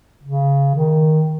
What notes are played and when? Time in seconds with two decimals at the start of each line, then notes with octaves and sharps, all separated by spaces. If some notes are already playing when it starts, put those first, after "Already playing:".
0.24 C#3
0.75 D#3